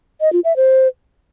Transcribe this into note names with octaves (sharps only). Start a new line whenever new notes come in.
D#5
F4
E5
C5